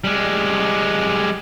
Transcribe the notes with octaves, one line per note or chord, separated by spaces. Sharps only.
G3 G#3